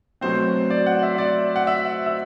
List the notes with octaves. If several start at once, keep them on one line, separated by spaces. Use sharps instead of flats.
B2 F#3 A3 C4 C5
D5
F#5
E5
D5
F#5
E5
E5